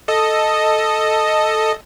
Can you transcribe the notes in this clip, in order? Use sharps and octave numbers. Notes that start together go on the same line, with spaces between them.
A4 D#5